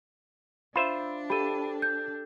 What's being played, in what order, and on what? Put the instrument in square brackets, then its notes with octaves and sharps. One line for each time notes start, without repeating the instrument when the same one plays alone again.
[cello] D4 [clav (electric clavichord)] F4 C5 E5 [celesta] B5
[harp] G4 A4 [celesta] B5 D#7
[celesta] G6